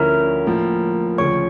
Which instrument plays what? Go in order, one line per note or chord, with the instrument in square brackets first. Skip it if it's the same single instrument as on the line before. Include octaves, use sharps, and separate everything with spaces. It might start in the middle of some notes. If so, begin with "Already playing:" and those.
Already playing: [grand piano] D2 D3 F3 C#4 E4 [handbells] A#4 A#5
[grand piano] A2 F3 A#3
[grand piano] D2 C#3 F3 [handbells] C#5 C#6